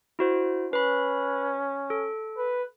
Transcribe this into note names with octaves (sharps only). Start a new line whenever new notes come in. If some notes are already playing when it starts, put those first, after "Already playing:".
E4 F#4 C5
C#4 B4 B5
A4
B4